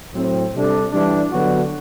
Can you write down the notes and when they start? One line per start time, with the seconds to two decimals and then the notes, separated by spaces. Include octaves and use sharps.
0.14 A2 F#3 C4
0.54 C3 G3 D4 A4
0.92 E3 G3 D4
1.31 D3 F#3 B3 F#4